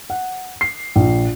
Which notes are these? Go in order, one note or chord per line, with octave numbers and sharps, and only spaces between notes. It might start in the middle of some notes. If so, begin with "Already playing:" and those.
F#5
C7
A#1